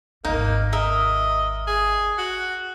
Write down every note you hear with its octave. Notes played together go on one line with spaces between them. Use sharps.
G#1 D#2 A#3 D#4
A#4 D#5 E5
G#4
F#4